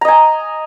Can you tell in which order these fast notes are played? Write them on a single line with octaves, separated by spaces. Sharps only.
A#5 D#5 G#5